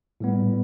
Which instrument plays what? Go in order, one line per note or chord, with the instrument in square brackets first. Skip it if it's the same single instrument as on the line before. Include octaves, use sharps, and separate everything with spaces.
[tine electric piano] A2 G3 B3